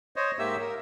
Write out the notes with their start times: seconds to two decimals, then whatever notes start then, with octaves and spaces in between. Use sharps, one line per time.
0.16 C5 C#5 D#5
0.39 G#2 A#3 G4 E5 E6
0.60 A#4